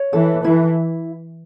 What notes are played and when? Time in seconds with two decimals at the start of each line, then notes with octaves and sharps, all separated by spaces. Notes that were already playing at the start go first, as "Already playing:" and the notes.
Already playing: C#5
0.13 E3 A4
0.44 E3 E4